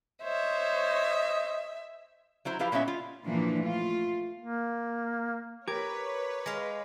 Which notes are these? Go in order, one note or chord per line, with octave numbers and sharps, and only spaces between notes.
C5 C#5 D#5 E5
F#3 E4 C5 A#5
F3 E4 G4 B4 F5
A#2 G#3 B3 C#4 E5
F4
A#2 E3 F3 A#3 D4
A3 F4
A#3
G4 A#4 B4 C#5 D6 G#6
G#3 F5 A#6